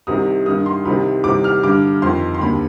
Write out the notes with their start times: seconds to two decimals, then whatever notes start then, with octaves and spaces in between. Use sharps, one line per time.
0.07 C2 C3 D#3 D#6
0.46 G2 D#3 D#6
0.66 C6
0.85 C2 C3 D#3 B5
1.24 C2 C3 D#3 D6
1.44 F6
1.63 G2 D3 D6
2.02 F2 D#3 C6
2.34 C6
2.41 D#2 D3 B5